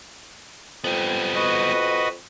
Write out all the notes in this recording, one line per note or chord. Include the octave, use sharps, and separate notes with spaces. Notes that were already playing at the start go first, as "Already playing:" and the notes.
F2 G3 B3
F#4 B4 D#5